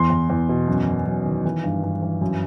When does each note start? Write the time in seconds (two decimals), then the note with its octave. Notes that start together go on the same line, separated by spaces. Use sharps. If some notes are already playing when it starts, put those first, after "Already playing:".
Already playing: E2 C6
0.10 E2
0.30 E2
0.49 B2
0.68 F#2
0.87 F#2
1.06 F#2
1.25 D#3
1.45 E3
1.64 G2
1.83 G2
2.02 E3
2.21 F#2